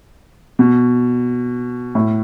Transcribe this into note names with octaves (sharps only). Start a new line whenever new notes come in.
B2
A2